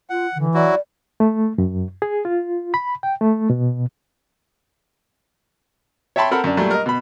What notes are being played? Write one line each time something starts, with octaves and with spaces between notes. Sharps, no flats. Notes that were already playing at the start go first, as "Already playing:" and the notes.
F4 F#5
D3 E3
F#3 E4 F#4 D5
A3
F#2
G#4
F4
B5
G5
A3
B2
C#5 E5 G5 A5 B5 C6
C4 A4 A#4 F#5 B5
F#2 D4
A#2 F#3 G3 A3
A#4 D#5
B2 B5